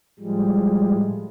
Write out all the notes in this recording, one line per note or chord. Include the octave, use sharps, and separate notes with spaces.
A2 F3 G3 G#3